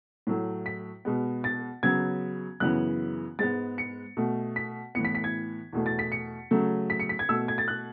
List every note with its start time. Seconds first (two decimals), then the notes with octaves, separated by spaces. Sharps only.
0.27 A2 F#3 A3
0.66 B6
1.05 B2 G#3 B3
1.44 A6
1.83 C#3 F#3 B3 G#6
2.60 F#2 C#3 E3 B3 F#6
3.39 G#2 G#3 B3 A6
3.78 C#7
4.17 B2 A3
4.56 B6
4.95 A2 E3 B3 C#7
5.05 B6
5.15 B6
5.24 G#6
5.73 E2 B2 A3
5.86 A6
5.99 B6
6.12 C#7
6.51 C#3 F#3 A3
6.90 B6
7.00 C#7
7.09 B6
7.19 G#6
7.29 B2 A3 E6
7.48 G#6
7.58 A6
7.68 F#6